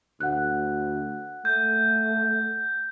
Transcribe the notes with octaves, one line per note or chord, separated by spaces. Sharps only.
D2 F#5 F#6
A3 G6